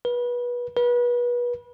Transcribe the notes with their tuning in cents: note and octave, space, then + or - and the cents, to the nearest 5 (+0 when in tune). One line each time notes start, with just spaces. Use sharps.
B4 -25
B4 -30